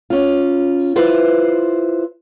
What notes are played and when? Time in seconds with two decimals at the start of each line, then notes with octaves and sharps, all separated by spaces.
0.10 C#4 F4
0.96 E4 F4 B4 C5